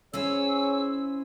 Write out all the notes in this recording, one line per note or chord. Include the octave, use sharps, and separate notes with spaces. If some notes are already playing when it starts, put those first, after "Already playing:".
C#4 E4 G#4 C5 C#5 E6